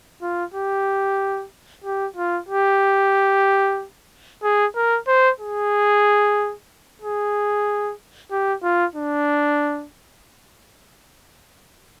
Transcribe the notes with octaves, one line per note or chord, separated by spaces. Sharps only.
F4
G4
G4
F4
G4
G#4
A#4
C5
G#4
G#4
G4
F4
D4